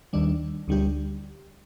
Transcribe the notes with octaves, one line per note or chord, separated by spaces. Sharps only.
D#2 D#3 G3 D4
D2 D3 G3 D4 G4